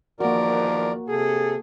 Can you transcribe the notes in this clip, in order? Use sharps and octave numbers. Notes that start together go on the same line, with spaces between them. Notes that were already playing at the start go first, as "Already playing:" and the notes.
E2 D#3 F3 A#3 F#4 A#4 D5
C3 G#4 A4